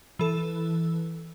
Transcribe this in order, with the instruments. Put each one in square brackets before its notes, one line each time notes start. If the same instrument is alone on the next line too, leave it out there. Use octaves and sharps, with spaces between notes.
[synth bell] E3 A4